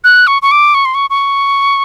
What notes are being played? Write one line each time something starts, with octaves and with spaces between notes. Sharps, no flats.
F#6
C#6
C#6
D6
C#6
C6
C#6
C#6